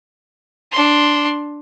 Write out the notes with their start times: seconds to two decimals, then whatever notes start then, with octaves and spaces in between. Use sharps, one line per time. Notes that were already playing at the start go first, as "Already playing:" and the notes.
0.72 D4 C6